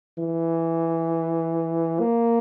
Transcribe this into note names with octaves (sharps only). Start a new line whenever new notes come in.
E3
A#3